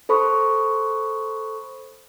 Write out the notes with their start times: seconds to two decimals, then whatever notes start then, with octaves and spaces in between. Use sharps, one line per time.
0.09 A4 C5 B5 C#6 D#6